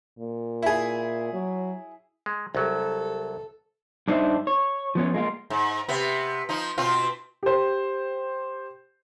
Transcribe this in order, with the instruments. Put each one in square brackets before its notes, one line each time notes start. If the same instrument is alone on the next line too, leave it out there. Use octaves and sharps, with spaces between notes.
[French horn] A#2
[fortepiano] E4 G#4
[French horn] F#3
[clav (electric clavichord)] G#3
[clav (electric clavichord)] C2 F#3 [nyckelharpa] A4
[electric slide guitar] G2 D4 D#4 C5 E5
C#5
F3 B3 C#4
G#3 A#3 F4
[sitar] G#2
C3 B3
F3 D#4
B2 C4 F4
[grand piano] G4 C5